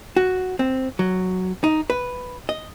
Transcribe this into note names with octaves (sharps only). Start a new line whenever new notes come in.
F#4
C4
F#3
D#4
B4
D#5